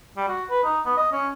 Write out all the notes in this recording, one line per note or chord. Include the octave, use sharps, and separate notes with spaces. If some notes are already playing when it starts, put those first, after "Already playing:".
G3
F#4
B4
D#4
B3
D#5
C#4